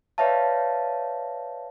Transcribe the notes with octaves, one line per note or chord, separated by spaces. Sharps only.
B4 C#5 D5 E5 F5 A5